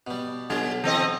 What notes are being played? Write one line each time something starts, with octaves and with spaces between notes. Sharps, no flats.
B2 G3
B1 D3 G3 F4
E3 C4 D#5